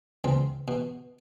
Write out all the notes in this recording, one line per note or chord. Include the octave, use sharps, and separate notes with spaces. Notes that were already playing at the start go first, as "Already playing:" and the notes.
C#2 C4
B2